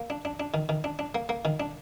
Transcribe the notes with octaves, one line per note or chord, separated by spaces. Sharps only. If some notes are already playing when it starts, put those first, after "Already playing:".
Already playing: A#3
D4
D4
D4
D#3
D#3
D4
D4
A#3
A#3
D#3
D4